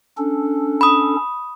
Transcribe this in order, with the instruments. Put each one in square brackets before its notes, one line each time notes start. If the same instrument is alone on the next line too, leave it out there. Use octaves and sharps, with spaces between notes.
[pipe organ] C#4 D4 A4
[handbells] B5 D#6